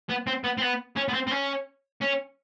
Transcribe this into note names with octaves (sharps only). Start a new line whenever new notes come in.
B3
C4
B3
C4
B3
C#4
B3
C4
C4
C#4
C#4